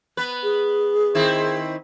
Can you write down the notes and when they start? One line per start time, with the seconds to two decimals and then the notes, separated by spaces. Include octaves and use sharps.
0.17 B3 B4
0.43 G#4
1.15 D#3 C4 E4